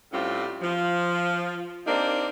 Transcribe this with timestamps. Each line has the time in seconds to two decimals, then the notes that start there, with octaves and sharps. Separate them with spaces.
0.11 A2 G3 C4 C#4 F4
0.61 F3
1.85 A#3 C4 D4 D#4 G4